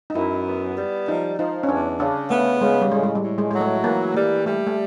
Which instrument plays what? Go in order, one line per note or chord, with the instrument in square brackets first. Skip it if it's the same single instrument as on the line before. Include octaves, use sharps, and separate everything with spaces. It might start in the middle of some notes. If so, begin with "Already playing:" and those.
[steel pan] D#4
[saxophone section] F#2 [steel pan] E4
[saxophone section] B3
G3
[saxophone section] F3 [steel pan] D#4
[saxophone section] F3 [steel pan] D#4
[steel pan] C#4
[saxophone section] E2 [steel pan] D4
[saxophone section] C#3 [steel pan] D4
[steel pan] A3 [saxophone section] B3
[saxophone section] C#3 [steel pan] G#3
[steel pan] G3
[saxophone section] A2 [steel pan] G#3
[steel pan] G#3
G3
[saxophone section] A2
[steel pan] G#3
[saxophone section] F#3 [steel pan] G#3
[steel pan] A3
[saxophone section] E3 [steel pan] A#3
[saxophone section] G3 [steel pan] A#3
[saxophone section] G3 [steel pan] A3
[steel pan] A3